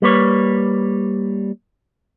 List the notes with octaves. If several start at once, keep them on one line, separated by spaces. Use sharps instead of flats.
G3 A#3 B4 C#5